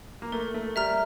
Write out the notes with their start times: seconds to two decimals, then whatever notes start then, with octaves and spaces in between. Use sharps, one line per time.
0.22 A#3
0.32 A3 A#4
0.54 A3
0.76 G3 E5 A#5 F6